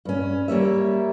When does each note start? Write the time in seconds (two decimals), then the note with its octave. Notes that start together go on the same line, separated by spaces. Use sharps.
0.05 G2 C#4
0.48 G3 A#3 C#5 E5